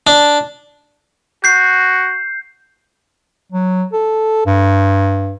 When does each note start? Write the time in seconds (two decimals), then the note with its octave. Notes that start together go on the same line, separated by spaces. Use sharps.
0.07 D4
1.44 F#4 G6 C7
3.52 F#3
3.93 A4
4.46 G2